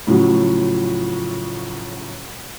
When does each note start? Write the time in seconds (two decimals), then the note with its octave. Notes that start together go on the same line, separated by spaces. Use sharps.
0.07 A2 C#3 F3 F#3